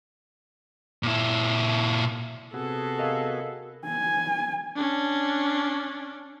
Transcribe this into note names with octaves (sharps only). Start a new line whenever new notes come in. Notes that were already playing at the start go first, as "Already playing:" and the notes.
A#2 E4
C3 B3 F#4 G#4 A4
A#4 D#5 F5
G#5
C#4 D4